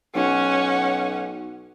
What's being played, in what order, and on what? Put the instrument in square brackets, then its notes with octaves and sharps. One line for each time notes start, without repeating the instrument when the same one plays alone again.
[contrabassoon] B1 [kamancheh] C#4 F#5